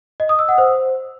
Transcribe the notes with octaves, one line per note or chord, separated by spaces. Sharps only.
D#5
D#6
E6
F#5
C5